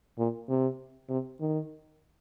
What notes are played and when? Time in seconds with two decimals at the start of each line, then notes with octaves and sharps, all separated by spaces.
0.18 A#2
0.48 C3
1.09 C3
1.40 D#3